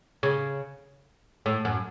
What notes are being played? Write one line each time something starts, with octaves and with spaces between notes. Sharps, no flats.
C#3
A2
F#2